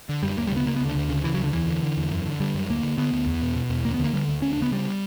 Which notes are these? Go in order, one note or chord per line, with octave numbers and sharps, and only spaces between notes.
D3
F#2 G3
D2 A#3
G3
C#3 B3
C#3 A#3
B3
D2
D3
D2
C#3
C#3 E3
F#3
D2
D3
E2 E3
D3
D3
E2
F#2
D3
D3 G3
F#2
D2 A#3
D3
D3 B3
D2
E2
B2
B2
E2
D2 A#3
B3
D3
A#3
D3 G3
D2
D2 C#4
D4
C#3
B3
C#3 G3